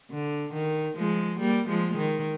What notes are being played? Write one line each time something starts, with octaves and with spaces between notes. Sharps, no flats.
D3
D#3
F3 G#3
G3 A#3
F3 G#3
D#3